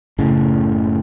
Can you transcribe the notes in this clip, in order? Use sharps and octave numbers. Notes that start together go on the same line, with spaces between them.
F#1 A2 C#3